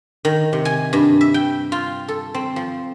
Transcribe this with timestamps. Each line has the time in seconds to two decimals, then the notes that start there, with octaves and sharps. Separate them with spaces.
0.25 D#3
0.53 C3
0.65 G#5
0.93 G2
1.21 E5
1.34 G5
1.72 F4
2.08 A4
2.34 C4
2.56 F3